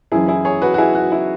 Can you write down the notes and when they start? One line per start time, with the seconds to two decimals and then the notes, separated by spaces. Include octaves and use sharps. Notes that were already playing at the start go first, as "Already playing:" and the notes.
0.12 F#1 F#2 C#3 E3 E4 G#4
0.28 E4 G#4
0.45 G#4 C#5
0.62 F#4 B4
0.74 F#4
0.78 E4 G#4
0.95 F#4
1.12 E4